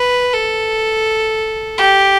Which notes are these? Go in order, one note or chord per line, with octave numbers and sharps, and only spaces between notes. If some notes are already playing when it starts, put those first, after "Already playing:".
Already playing: B4
A4
G4